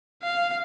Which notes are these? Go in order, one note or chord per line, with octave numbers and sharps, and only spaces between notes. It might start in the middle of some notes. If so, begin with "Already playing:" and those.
F5